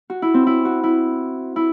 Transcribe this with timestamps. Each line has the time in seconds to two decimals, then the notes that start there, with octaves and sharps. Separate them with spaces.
0.10 F#4
0.22 E4
0.34 C4
0.47 E4
0.65 F#4
0.84 E4
1.56 E4